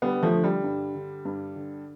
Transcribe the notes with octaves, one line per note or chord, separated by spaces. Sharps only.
D3 G3 B3
F3 A3
D3
G3
G2
D3
G2
D3